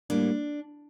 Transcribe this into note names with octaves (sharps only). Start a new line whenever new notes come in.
A2 G3 A#3 D4